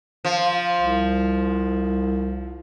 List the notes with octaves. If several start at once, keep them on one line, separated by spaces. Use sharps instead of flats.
F3
C2